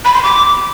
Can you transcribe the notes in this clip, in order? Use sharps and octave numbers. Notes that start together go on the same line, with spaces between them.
B5
C6
D6